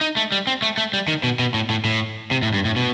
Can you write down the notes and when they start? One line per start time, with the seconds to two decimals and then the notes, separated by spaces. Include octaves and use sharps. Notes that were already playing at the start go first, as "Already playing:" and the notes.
0.01 D#4
0.17 A3
0.32 G3
0.47 C4
0.62 A3
0.78 A3
0.93 G3
1.08 D#3
1.23 B2
1.39 B2
1.54 A2
1.70 A2
1.85 A2
2.31 C3
2.43 A2
2.54 G2
2.65 A2
2.76 B2